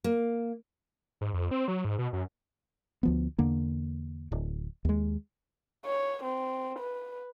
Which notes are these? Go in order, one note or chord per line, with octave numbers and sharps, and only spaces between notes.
A#3
G#2
F2
C4
F#3
G#2
B2
F#2
D2 F3 B3
E2 D3 A#3
D1
D#2 G#3
C#5
C4
B4